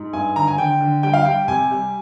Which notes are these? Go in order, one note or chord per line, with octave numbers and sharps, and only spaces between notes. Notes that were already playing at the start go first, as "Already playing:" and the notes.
Already playing: G#2
G2 G#5
D3 A#5
G#5
D3 G5
D3
G3 G5
F5
G3 G5
C3 G#5
G3